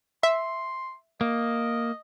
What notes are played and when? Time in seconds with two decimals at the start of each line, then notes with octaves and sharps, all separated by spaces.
0.23 E5 C6
1.21 A#3 D#5